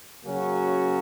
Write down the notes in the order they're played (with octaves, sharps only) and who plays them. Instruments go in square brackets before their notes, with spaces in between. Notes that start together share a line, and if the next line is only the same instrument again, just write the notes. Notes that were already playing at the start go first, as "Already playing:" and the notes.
[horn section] C#3 F#3 A#3 C#4 F#4